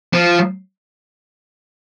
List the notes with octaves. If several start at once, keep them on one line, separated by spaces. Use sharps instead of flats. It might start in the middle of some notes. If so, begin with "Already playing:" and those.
F3